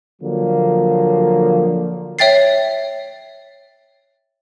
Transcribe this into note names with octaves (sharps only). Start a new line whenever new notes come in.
D3 F3 F#3 A#3
C#5 E5 G5 A6 C7